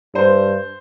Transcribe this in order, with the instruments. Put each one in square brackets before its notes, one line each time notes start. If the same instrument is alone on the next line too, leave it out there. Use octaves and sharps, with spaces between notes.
[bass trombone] G2 [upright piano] C5